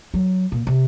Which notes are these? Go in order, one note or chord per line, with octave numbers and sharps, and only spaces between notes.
F#3
A#2
C3